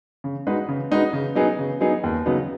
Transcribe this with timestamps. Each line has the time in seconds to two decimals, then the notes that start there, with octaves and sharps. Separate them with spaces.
0.24 C#3
0.47 G#3 D#4 F#4 B4
0.68 C#3
0.91 G#3 D#4 F#4 B4
1.13 C#3
1.35 F#3 B3 D#4 G#4
1.59 C#3
1.81 F#3 B3 D#4 G#4
2.03 D#2
2.26 C#3 F#3 B3 D#4